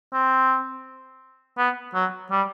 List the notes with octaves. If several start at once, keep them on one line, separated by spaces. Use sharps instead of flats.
C4
B3
F#3
G3